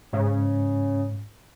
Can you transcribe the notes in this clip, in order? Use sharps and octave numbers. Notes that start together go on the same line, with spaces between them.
G#2 C#3